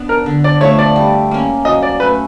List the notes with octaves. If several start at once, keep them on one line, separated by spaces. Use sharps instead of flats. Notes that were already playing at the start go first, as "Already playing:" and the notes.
Already playing: B3 D4
A#4
D3
D5
F3 A3 C#5
D5
G3
A#3 C#4
F#3 D#5
D5
A3 C#4 B4